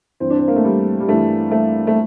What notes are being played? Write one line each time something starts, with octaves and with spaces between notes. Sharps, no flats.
G2 E3 C4
D4
C4
A#3
A3
G3
G3
G2 E3 A3
A3
A3